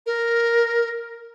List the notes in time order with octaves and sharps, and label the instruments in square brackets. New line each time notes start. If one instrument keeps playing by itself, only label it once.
[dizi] A#4